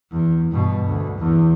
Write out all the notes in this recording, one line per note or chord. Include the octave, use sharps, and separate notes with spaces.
E2
G2 B2
D2
E2